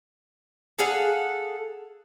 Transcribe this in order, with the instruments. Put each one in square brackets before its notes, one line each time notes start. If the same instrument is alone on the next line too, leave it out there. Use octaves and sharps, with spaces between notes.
[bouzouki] G#4 A4 F5 F#5